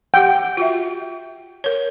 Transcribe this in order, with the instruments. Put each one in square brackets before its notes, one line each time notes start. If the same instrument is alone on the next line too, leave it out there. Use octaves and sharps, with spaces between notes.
[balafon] G4 F#5 [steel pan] G5
[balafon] F4 F#4 E5
A#4 C#5